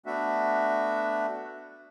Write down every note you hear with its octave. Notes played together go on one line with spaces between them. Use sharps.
A3 B3 D4 F#4 E5